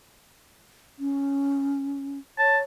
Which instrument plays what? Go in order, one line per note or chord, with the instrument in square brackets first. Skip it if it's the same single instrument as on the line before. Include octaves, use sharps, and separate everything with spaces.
[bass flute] C#4
[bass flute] C#5 [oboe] A5